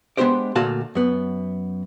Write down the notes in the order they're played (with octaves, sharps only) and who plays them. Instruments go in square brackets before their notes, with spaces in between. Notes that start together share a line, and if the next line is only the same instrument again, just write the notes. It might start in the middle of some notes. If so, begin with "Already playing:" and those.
[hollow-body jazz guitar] G#3 B3 D4 G4 C5 D5
D2 A#2 A3 F#4 F5 A5
F#2 B3